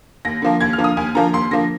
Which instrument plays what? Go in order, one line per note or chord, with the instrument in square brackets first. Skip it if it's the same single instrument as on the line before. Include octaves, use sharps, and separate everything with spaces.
[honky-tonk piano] D#2 A#6
D3 F3 A#3
D#2 G#6
F6
D3 F3 A#3
D#6
D#2 G#5
D3 F3 A#3 A#5
D#2 C6
D3 F3 A#3 A#6